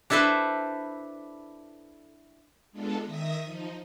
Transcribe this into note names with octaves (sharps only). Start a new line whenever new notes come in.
D4 E4 A4 B4 C5 E5
G#3 B3 D4 F4 A4
D#3 E5 D#6 A#6
F3 D#4